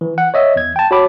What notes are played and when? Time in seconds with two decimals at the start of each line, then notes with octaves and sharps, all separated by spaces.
0.01 E3
0.18 F#5
0.34 C#5 D#5 E5
0.56 E2 G#6
0.76 G5 A5
0.91 F#4 C#5 A5 B5 D6